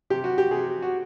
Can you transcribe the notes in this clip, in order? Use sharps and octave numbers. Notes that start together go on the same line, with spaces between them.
C3 G4
F#4
G4
C3 G#4
F#4